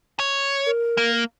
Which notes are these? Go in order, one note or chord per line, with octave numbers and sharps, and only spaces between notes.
C#5
A#4
A#3